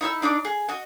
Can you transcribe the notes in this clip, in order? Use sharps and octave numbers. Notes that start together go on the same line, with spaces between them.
D#4 E4 G#5 E6
D4 D#4 D5 D6
G#4
F#4 D#5